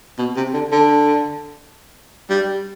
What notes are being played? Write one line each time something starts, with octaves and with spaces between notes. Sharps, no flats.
B2
C3
D3
D3
G3